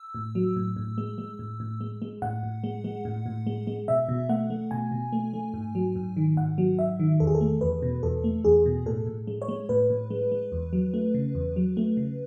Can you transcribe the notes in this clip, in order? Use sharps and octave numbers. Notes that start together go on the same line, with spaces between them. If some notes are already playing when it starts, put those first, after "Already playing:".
Already playing: E6
A2
F#3
A2
A2
G#3
G#3
A2
A2
G#3
G#3
A2 F#5
A2
G#3
G#3
A2
A2
G#3
G#3
B2 E5
B2
A3 F#5
A3
B2 G#5
B2
A3
A3
G#2
F#3
G#2
D#3
G#2 F#5
F#3
G#2 E5
D#3
E2 A4
G#4
A4
A3
E2 B4
B2
E2 A4
A3
E2 G#4
B2
A2 A4
A2
G#3
C#5
G#3
A2 B4
A2
G#3
G#3
E2
F#3
A3
C#3
E2
F#3
A3
C#3